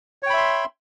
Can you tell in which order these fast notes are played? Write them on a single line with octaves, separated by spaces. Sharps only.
C#5 G5 B5 E5 C6